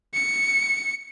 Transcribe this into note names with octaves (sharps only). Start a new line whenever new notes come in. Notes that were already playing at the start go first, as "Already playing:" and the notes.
C#7